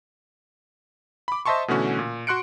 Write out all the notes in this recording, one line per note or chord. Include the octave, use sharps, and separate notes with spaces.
B5 D6
C5 D#5 E5 A5 C6 C#6
B2 D3 E3 A3 C#4 F#4
A#2
F#4 C6 F#6 C#7 D7